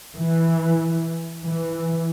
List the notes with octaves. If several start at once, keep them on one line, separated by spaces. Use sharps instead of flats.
E3
E3